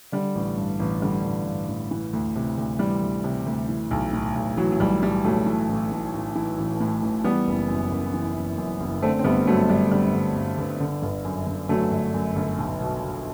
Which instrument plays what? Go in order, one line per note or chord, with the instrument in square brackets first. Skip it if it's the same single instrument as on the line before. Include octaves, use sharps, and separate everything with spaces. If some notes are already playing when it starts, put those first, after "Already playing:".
[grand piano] D3 G3
A1
G2
A1
D3 G3
A1
G2
A1
E3
D2
C3
D2
E3 G3
D2
C3
D2
E3
B1
A2
B1
E3 F#3
F#3
B1 G3
A2 G3
B1 F#3 A3
E3
A1
A2
A1
E3
A1
A2
A1
E3 G3 B3
F#1
F#2
F#1
E3
F#1
F#2
F#1
D3 A3 C4
C4
G1 G3 B3
G2 F#3 A3
G1 G3
D3 G3
G1
G2
G1
D3
G1
F#2
G1
D3 F#3 A3
G1
F#2
G1
B1
B2
B2